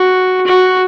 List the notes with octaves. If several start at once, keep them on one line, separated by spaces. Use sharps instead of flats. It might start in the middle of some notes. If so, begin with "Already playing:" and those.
Already playing: F#4
F#4